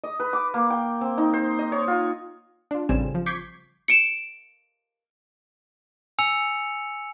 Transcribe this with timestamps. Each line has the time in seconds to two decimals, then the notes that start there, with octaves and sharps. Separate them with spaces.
0.04 D#5
0.20 B4
0.33 D6
0.54 A#3
0.70 G5
1.01 C4
1.18 D#4
1.33 C5
1.59 D#5
1.72 C#5
1.88 F4
2.71 D4 F4
2.89 A1 C#3 G3 C4 G#5 E7
3.14 F3
3.26 C#6 D6 G6 G#6 B6 C7
3.88 C#7 D7 E7
6.19 G#5 E6 C#7 F7